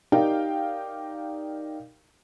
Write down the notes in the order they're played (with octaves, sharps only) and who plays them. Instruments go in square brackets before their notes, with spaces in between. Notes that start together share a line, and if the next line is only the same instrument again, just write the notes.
[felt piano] D#4 G4 A#4 D5 F5 G5